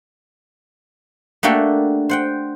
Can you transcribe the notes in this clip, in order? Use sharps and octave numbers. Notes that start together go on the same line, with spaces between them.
A3 A#3 D4 F#4 G4 A4
C5 F#5 G5